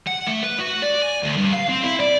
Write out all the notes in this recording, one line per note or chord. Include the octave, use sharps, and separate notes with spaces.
F#5
A3
B4
F#4
D5
G#5
D2
G2
F5
C4
E4
D5